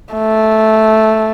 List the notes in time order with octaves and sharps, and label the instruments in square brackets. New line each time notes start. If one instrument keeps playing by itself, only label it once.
[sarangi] A3